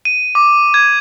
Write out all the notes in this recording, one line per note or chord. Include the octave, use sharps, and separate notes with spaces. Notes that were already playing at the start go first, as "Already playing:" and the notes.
D#7
D6
G#6